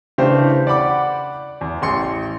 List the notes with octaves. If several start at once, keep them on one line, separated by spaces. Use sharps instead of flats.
C#3 E3 A3 D4 G4 C5
D5 F#5 B5 D6
E2
A1 C6 C#7